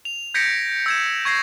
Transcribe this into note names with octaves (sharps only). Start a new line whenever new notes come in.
F7
G6 G#6 A#6 B6 C#7 D7
E6 G#6 E7
C#6 G#6 A#6 C7